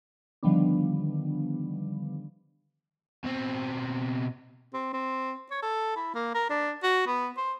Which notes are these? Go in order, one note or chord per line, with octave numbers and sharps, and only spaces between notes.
D3 D#3 F3 G3 B3 D4
B2 C4
C4
C4
C#5
A4
E4
A#3
A#4
D4
F#4
B3
C5